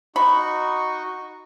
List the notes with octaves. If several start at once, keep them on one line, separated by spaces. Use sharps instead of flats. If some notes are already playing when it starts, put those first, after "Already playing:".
D#4 F#4 B5 C#6